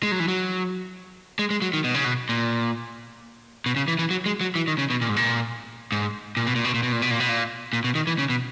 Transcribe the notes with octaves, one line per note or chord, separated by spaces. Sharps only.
G#3
F#3
E3
F#3
G#3
G#3
F#3
D#3
B2
C#3
B2
A#2
B2
C#3
E3
E3
F#3
G#3
F#3
E3
D#3
C#3
B2
A#2
G#2
A#2
G#2
A#2
B2
A#2
B2
A#2
B2
A#2
B2
A#2
B2
A#2
A#2
B2
D#3
E3
C#3
B2